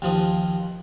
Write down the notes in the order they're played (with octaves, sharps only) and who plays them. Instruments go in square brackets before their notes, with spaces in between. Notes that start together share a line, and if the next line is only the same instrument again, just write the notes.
[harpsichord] D#2 F3 D#6